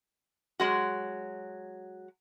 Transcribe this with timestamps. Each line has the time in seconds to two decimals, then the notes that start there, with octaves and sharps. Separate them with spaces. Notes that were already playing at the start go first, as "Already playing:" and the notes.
0.60 F#3 G#3 F#4